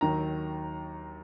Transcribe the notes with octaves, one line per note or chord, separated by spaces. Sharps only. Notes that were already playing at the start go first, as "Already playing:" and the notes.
D#2 D#3 F#3 A#5